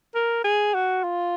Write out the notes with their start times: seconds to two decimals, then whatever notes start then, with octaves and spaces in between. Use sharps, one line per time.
0.15 A#4
0.44 G#4
0.74 F#4
1.03 F4